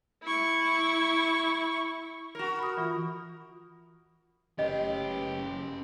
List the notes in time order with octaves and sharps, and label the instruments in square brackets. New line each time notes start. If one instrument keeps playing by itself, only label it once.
[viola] E4 C#6
[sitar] F#4 A#4
[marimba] B5 D#6
E3 F4
[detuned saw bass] F#1 [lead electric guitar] C#4 B4 [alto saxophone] G4 [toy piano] D#5